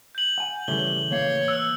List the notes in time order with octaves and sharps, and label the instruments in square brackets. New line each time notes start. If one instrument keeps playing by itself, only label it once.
[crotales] G6 F#7
[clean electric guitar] F#5 G#5
[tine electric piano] A2 C#3 A3 [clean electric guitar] E3 G3 C#5 [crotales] G7
[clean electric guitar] E3 A#3 F5 [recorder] C#5
[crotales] E6 F#6